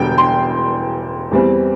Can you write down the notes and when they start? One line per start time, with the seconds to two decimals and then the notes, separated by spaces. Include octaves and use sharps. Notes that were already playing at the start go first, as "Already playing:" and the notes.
Already playing: E1 E2 D3 G3 G5
0.18 C6
1.31 E2 E3 G3 C4